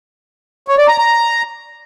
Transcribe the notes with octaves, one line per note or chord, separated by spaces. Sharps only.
C#5
D5
A#5
A#5